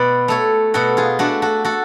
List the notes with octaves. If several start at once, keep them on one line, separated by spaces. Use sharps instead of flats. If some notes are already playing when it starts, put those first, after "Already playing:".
Already playing: B2 B4 D5
A3 A4 C#5
B2 F#4 A4
F4 G#4
A3 D4 F#4
F#4 A4
F#4 A4